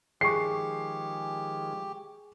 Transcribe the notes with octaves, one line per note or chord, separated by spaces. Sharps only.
D#3 F3 G#3 G4 G#4 C#6 C7